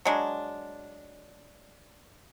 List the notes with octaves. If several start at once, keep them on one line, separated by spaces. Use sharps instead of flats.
F#3 G#3 D4